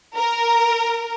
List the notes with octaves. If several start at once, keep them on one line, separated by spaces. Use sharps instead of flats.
A#4